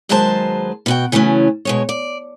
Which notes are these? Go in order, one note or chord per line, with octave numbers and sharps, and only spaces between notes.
D#2 F#3 G#3 B4 C5 A5
B2 F#4 G5
C#3 E3 F#3 A3 C#4
B2 G#3 C#5
D5